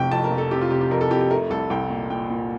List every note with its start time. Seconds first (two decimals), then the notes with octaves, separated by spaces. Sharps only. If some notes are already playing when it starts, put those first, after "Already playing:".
Already playing: F1 C3 G5
0.11 F2 A5
0.24 A#4
0.31 F1
0.38 A4
0.51 C3 G4
0.62 F4
0.71 C3 G4
0.81 G4
0.91 F2 A#4
1.01 A4
1.11 F2 G4
1.21 G4
1.31 A3 A#4
1.50 C2 A4
1.70 C2 G5
1.90 A#2
2.10 A#2 G5
2.30 A#2